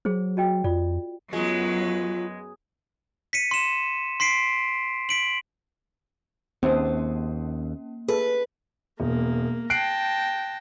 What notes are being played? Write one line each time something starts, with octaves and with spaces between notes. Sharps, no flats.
F#3 G#4 C5
F#4 D#5 G5
F2 F4 D5
F#2 F#3 G#3 B3 F4 B4
B6 C#7 D#7
C6 E7
C6 B6 C7 D7
B6 D7 F#7
D#2 A#3 C4 C#4
G#4 A4 B4
E1 A#3
G5 A5 F#6 A#6 C7 D7